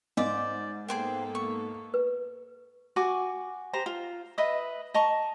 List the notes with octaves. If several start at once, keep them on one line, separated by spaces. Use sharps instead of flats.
G#2 C5 D5 D#5 F5 G#5
A#3 B3 G#4 A4 C5 G5
C#6
B4
F#4 G#5 C#6 D6
G4 C5 A#5
F4
B4 D#5 E5 D#6
D#5 A5 A#5 C#6